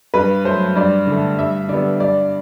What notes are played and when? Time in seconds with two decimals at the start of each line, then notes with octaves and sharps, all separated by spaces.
0.14 G2 B4
0.45 F#3 A3 C5
0.75 G2 D5
1.07 D3 A3
1.38 G2 E5
1.69 D3 G3 B3 D5
2.00 G2 D5